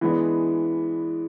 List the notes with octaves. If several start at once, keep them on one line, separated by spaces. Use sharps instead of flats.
E3 G#3 B3 D4